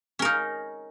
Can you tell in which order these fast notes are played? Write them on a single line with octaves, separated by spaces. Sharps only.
C#4 A#4 D#4